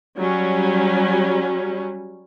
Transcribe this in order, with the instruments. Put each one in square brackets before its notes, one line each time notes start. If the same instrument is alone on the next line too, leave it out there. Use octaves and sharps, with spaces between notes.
[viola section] F#3 G3 C#4